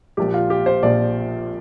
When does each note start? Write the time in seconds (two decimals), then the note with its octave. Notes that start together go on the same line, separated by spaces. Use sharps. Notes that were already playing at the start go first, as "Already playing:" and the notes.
0.17 A#1 A#2 F3 G4
0.34 F4
0.50 G4
0.66 C5
0.83 A#1 A#2 F3 D5